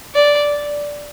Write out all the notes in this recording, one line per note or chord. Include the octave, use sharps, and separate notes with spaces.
D5